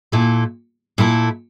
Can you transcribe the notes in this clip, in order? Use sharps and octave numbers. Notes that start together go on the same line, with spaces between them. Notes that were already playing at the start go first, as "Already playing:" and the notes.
A#2 A3 E4 A4
A#2 A3 E4 A4